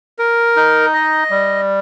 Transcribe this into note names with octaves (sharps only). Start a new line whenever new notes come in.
A#4
D#4
D#5
G3